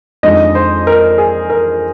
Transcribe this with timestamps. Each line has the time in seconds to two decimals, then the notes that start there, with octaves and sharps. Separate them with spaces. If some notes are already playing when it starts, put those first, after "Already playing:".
0.23 F2 D#3 G#3 D4 D#5
0.55 C5
0.87 A#4
1.18 G#4
1.50 A#4